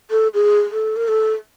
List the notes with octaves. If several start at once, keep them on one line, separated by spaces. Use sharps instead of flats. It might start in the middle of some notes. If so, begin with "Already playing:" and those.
A4
G#4
A4
A#4
A4